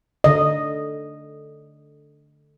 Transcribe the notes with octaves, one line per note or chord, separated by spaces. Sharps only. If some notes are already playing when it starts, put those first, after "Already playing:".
D3 D#5